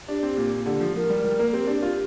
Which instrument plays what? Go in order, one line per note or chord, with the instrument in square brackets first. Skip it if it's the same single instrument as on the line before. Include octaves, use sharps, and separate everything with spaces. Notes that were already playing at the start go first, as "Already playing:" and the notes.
[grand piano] D4 [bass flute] G4
[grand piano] C4
A#2
[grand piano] D3 [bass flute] G4
[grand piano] F3
[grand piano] F3 [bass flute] A#4
[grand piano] G3
G3
A#3
[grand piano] C4 [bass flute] G4
[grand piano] D4 [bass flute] G4
[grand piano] F4 [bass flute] G4